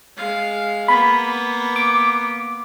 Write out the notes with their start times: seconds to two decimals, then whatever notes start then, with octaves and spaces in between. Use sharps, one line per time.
0.17 G#3 F5
0.88 A#3 B3 B5
1.76 D6